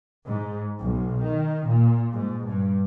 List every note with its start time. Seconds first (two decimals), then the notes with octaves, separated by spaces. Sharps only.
0.24 G#2
0.77 B1
1.20 D#3
1.66 A#2
2.13 G#2
2.47 G2